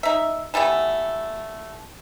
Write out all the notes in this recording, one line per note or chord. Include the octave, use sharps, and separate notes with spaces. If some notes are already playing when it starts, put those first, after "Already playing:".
D#4 E5
E3 G3 A3 B3